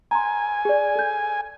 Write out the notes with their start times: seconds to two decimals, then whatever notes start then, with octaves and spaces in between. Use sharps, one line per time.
0.11 G#5 A#5 C6
0.65 G#4 D5
0.95 A4 G6